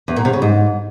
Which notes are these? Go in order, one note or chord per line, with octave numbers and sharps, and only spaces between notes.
E2
A#2
C3
C#3
G#2